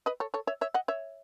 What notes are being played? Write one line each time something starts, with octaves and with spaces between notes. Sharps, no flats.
B4 D#5
A4 C#5
A4 C#5
C#5 E5
C#5 E5
D#5 F#5
C#5 E5